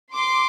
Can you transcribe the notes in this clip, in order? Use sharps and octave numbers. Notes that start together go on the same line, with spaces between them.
C6 D6